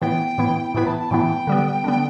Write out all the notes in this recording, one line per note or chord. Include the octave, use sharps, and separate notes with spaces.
A2 E3 B3 E4 G5
A2 E3 B3 E4
A2 E3 B3 E4 B5
A5
A5
A2 E3 B3 E4 G5
D3 G3 B3
D3 G3 B3